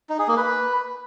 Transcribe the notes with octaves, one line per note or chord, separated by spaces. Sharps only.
D#4
G#4
A#3
B4